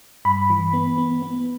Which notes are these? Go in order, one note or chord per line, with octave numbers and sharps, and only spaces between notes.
G2 B5
E3
B3
B3
B3